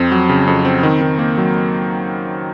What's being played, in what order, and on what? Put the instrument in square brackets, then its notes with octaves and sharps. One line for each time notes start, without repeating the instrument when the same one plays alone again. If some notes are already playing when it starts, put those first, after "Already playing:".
Already playing: [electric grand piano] F2 C4
F#3
C#3
F2
C4
D#3
D#3
A#3
F#3